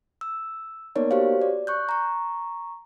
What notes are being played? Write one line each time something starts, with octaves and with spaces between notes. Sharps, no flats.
E6
A#3 B3 D#4 A#4 C#5 D5
F#4 G4 C5 C#5 F5
D5
C#6 F#6 G6
A#5 C#6